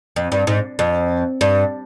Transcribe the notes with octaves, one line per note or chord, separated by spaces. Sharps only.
F2
G2
G#2
F2
G2